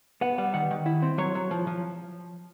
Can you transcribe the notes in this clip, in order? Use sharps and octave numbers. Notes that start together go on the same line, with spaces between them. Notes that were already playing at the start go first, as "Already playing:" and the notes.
B3 F#5
G3 F#5
D#3 F#5
D#3
E4
C4
F#3 C#5
F#3
F3
F3